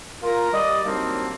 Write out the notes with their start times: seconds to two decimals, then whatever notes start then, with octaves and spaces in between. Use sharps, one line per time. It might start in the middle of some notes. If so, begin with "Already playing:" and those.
0.23 F4 A#4
0.52 G3 D5 D#5
0.84 F#3 G3 A#3 C4 D4 D#4